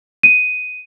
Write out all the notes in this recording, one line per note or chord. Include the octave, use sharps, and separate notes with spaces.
D#7